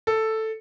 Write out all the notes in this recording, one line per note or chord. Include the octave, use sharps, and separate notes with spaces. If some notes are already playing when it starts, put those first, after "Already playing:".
A4